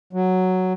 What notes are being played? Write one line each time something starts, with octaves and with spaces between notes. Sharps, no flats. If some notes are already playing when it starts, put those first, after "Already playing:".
F#3